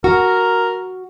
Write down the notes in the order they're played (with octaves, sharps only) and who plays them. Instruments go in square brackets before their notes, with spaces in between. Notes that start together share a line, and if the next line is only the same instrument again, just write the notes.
[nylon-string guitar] F#4 [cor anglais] A#4